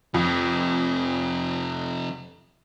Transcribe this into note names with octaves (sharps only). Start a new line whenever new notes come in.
F2 C3 F3